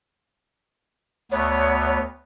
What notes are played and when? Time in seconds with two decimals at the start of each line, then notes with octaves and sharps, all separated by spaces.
1.31 D2 B3 C#5